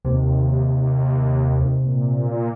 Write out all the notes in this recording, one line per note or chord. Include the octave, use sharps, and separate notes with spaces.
D#2 C3
A#2